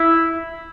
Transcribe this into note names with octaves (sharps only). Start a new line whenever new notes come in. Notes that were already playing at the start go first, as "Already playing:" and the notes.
Already playing: E4